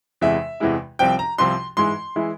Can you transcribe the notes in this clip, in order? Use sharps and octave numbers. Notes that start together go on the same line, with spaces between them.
E2 C3 E3 G#3 E4 E5
E2 C3 E3 G#3 E4
C2 C3 F3 C4 G5
A#5
C2 C3 F3 C4 C6
G#2 E3 G#3 E4 C6
E3 G#3 E4